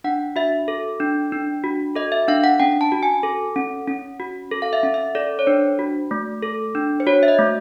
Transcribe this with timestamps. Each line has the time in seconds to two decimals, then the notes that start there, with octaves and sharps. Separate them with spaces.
0.04 D4 F#5
0.36 F#4 E5
0.68 A4
1.00 D4
1.32 D4
1.64 F#4
1.96 A4 D#5
2.12 E5
2.28 D4 F5
2.44 F#5
2.60 C#4 G5
2.81 A5
2.92 F#4
3.03 G#5
3.23 A4
3.56 C#4
3.88 C#4
4.20 F#4
4.51 A4
4.62 F5
4.73 E5
4.83 C#4
4.94 E5
5.15 A4 D5
5.39 C#5
5.47 D4 C5
5.79 F#4
6.11 A3
6.43 A4
6.75 D4
7.00 C5
7.07 F#4 C#5
7.23 E5
7.28 D#5
7.39 A3